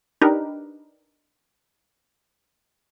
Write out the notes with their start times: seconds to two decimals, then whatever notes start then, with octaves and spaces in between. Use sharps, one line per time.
0.21 D4 D#4 G4 A#4 B4